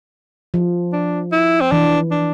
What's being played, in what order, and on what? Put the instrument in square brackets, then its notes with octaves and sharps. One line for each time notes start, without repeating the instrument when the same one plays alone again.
[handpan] F3
[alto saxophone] D4
E4
C4
[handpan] E3 [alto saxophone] D4
[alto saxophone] D4